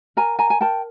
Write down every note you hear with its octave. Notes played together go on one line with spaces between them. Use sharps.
A#4 G#5 A#5
G#5 A#5
G#5
A#4 G5 A5